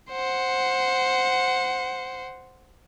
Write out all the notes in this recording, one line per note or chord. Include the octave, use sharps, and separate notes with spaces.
C5 F#5